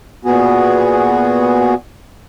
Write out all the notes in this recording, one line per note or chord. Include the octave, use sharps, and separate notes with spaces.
A#2 B3 F#4 G#4